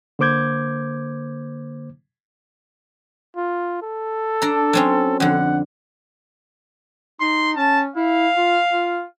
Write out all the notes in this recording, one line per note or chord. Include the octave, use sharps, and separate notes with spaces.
D3 A#3 C5 D6 G6 G#6
F4
A4
D4 A#5
F#3 C4 C#4
F2 D3 F#5
D#4 C6
C#4 A5
E4 F5
F4
F4